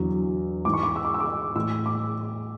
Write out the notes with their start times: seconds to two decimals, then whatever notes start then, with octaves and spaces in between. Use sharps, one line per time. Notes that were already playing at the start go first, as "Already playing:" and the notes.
Already playing: E2 D3 F#3
0.65 G#2 E3 D6
0.73 C#6
0.83 D6
0.96 E6
1.05 D6
1.14 E6
1.20 D6
1.26 E6
1.55 A2 E3 E6
1.86 D6